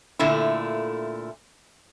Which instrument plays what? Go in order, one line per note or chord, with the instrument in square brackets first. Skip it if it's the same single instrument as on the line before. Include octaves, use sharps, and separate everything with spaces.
[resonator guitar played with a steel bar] A#2 D3 A3 E4